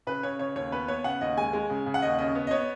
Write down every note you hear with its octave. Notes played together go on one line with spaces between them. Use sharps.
C#3 B4
C#3 C#5
C#3 C#5
D#2 C#5
B3 B4
B3 C#5
C#3 F#5
D#2 D#5
G#3 G#5
G#3
C#3
C#3
F#5
D#2 D#5
C#3 D#5
B3
D#5
B3 C#5